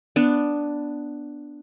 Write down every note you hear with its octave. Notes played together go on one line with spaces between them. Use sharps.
B3 D4